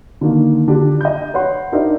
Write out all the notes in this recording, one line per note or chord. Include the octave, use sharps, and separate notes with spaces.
D3 D#3 A#3
D3 D4 F4 G4
D#5 G6
B4 C#5 F#5 C6
D4 D#4 A#4 C5 D5 E5